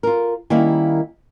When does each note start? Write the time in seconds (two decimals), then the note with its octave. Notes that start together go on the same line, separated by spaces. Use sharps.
0.03 F4 A#4
0.50 D#3 G3 A#3 C#4 E4 F5